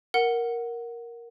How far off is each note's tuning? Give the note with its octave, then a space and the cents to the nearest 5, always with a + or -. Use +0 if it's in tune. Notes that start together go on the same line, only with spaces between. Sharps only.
A#4 +5 F#5 +0